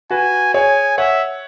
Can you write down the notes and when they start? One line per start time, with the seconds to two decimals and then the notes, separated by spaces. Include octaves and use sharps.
0.10 F#4 B4 G#5
0.54 G#4 C#5 G#5
0.98 C#5 E5 F#5